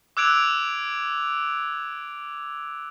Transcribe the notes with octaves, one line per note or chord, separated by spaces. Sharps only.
D6 E6 F#6 G#6 D7 F7